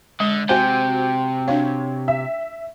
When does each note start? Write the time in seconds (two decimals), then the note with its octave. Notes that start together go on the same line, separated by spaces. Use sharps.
0.20 D3 G#3
0.49 C3 F#4 C5 G5 G#5
1.48 D4 F#4 C#5 F5
2.08 E5